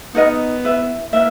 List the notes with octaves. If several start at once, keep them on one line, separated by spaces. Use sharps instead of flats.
B3 D#4 A#4 D#5
E4 B4 E5
A#3 E4 B4 E5